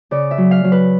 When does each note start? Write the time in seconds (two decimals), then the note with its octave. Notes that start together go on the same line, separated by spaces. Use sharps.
0.11 C#3 D5
0.31 E5
0.38 F#3
0.51 F5
0.64 F#3
0.72 B4